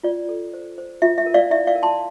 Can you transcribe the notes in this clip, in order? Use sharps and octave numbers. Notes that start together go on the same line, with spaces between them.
F4 D5
A4
C5
C5
F4 E5
E5
A#4
D5 F5
E4 E5
D5 F5
A#4
A5 C6